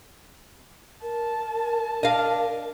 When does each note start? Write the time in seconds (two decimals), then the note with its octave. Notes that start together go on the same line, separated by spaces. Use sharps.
1.02 A#4 A5
2.03 D4 D#5 F5